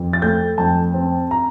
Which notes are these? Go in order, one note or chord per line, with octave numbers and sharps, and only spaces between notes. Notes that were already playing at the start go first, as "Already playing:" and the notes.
Already playing: F2
A6
A3 G6
F2 A5
C4
A#5